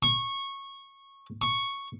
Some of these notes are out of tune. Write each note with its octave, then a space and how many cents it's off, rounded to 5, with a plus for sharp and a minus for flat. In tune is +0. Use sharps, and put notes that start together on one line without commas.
C#6 -15
C#6 +0